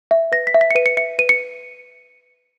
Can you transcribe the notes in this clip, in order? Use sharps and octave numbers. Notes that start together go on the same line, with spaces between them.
E5
B4 A#6
B6
E5
B6
C#7
B4 D#7
C#7
E5 C#7
B4 D#7
C#7